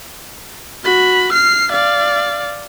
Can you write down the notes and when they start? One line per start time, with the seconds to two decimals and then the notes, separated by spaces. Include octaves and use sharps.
0.84 F#4 B5
1.32 F6 C7
1.72 D5 F5